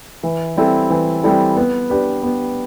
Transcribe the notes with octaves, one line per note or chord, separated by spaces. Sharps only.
E3
G3 C4 E4 A4
E3
G3 C4 E4 A4
B3
D4 G4 B4
B3